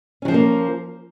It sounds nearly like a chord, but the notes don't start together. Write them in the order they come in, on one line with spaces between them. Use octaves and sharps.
C#4 F#3 F3 G#3 A#3